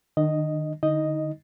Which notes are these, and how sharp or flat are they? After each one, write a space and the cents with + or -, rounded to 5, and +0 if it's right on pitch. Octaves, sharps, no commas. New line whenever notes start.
D#3 -25 D4 +40 D#5 +0
D3 +30 D#4 +20 D#5 +0